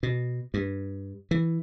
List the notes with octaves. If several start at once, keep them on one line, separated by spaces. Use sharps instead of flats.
B2
G2
E3